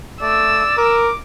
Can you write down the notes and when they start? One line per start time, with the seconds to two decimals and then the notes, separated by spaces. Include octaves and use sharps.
0.22 A3 D5 E6
0.78 A#4 D6